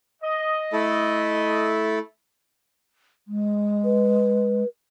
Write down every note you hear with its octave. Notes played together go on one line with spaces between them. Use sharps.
D#5
A3 E4 A4
G#3
B4